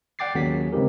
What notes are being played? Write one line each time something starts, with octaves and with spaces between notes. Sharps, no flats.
D5 F#5 G5 D6 A6 C7
D#2 F#3 C#4 G#4 C#5 B6
C#3 G#3 C4 D#4 G4 A#4